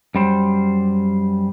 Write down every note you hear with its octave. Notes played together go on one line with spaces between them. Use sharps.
F#2 G3 C5